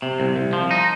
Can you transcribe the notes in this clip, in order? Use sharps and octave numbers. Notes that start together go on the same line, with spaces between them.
C3
C2
C2
F3
D#4